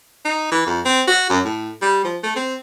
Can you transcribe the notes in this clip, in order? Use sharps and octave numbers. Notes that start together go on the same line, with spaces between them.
D#4
E3
F2
C4
F#4
F#2
A2
G3
F3
A3
C4